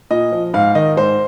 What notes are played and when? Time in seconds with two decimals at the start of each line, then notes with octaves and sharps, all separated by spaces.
0.11 A#2 D#5
0.32 F3
0.54 G#2 F5
0.75 D#3 D#5
0.97 G#2 C5